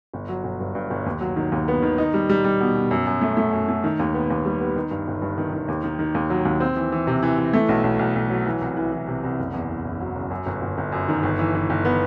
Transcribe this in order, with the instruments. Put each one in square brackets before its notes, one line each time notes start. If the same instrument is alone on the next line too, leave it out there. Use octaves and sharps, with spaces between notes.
[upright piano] G1
F#3
G1
G2
G2
G1
D#2
F#3
D#3
D#2
B3
D#3
D#4
G3
G3
G3
B2
B2
F#2
F#2
A3
A3
F#2
A3
D#3
D#2
B3
D#2
G3
B3
D#3
G2
G1
G2
D#3
D#3
D#2
D#3
D#3
D#2
F#3
D#2
C4
E3
E3
C3
E3
E3
A3
B1
B1
B1
B1
F#3
E3
C2
E3
E3
C3
C2
F#1
E2
E2
F#1
F#3
F#1
F#2
G1
G1
G1
F#2
D#3
G1
E3
E3
G1
B3